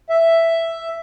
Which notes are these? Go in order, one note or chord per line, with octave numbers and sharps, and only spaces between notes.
E5